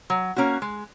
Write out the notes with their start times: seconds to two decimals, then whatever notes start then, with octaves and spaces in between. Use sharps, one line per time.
0.10 F#3
0.36 A#3 C#4 F#4
0.62 G#3